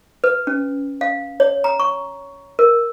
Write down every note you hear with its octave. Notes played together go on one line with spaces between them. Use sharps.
B4
C#4
F5
C#5
A#5
C#6
A#4